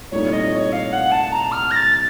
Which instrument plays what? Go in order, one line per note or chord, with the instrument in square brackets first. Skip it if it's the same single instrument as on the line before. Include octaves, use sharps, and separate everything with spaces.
[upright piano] C2 A#2 A3 D#4 [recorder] C#5
[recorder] D#5
C#5
F5
F#5
A5
A#5
F6
A#6
A6